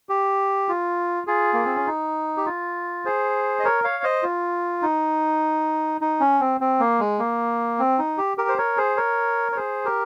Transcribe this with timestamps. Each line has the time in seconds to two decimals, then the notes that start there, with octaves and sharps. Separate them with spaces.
0.09 G4
0.68 F4
1.27 F4 G#4
1.53 A#3
1.65 C4
1.76 C#4
1.87 D#4
2.37 G4
2.46 F4
3.05 G#4 C5
3.59 D#5
3.65 A#4 C#5
3.84 C#5 F5
4.04 C5 D#5
4.23 F4
4.82 D#4
6.01 D#4
6.20 C#4
6.40 C4
6.61 C4
6.80 A#3
7.00 G#3
7.19 A#3
7.79 C4
7.99 D#4
8.18 G4
8.37 G4 A#4
8.49 C5
8.58 A#4 C#5
8.77 G#4 C5
8.97 A#4 C#5
9.52 C#5
9.56 G#4 C5
9.85 G4 A#4